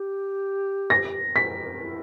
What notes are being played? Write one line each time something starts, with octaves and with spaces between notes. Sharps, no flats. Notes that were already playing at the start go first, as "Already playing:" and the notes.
Already playing: G4
A#6
B6
E4